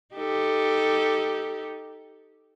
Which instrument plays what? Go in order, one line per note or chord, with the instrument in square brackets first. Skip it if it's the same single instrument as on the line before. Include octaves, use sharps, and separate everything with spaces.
[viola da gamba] D#4 G4 A4